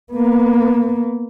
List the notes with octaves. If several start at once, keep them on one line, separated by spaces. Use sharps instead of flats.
A#3 B3